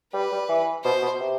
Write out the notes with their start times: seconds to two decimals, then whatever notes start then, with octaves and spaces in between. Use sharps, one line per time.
0.13 G3 B4
0.32 G3
0.49 E3
0.84 B2 C5
1.02 B2
1.20 C3